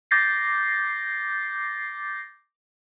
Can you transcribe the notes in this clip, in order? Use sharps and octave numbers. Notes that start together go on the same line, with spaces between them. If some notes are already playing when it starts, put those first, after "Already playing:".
D6 G6 A6 A#6 C7